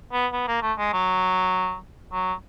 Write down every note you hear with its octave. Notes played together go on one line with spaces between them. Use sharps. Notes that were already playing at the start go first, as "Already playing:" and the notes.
B3
B3
A#3
A3
G#3
F#3
F#3